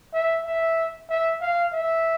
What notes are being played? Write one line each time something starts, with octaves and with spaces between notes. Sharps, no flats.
E5
E5
E5
F5
E5